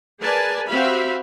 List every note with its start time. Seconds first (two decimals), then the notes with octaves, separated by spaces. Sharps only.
0.20 G#4 A#4 B4 D5 G#5 A5
0.68 C4 F#4 G4 E5 F5 B5